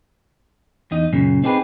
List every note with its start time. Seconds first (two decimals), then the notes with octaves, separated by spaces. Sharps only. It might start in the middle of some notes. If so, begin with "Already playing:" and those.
0.91 E2 D#4 D#5
1.13 F#2 A#2 C#3
1.44 C4 D#4 G4 G#4 A#4 B4